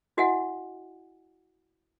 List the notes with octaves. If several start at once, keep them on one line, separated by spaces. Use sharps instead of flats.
E4 F#4 D#5 E5 F#5 G#5